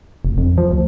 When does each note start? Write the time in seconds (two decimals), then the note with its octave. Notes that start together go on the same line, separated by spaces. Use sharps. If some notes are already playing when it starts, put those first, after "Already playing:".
0.25 F1
0.38 F2
0.58 F3
0.72 D2